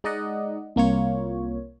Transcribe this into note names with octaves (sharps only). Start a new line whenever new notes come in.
G#3 D#4 D5 D#5 F#5
C2 A#3 F4 C#5